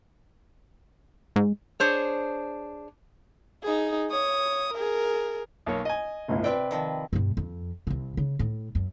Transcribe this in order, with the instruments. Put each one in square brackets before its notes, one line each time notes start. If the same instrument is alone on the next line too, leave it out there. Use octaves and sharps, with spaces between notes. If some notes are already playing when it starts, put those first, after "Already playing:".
[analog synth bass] G#2
[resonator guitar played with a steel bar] D4 G#4 C5 C#5
[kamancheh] D#4 G#4
C#5 D#6
G#4 A#4
[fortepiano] B1 A#3 C#5
D#5 G#5
[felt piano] G1 C#2 A2
[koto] C3 C4 G5 [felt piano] B4 D5
[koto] D#3 F3 C4
[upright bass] G2 B2
F2
C2 C3
C#3
A2
F#2